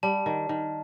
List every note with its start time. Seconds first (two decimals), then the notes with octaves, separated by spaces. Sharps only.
0.03 G3 A5
0.26 D#3
0.49 D#3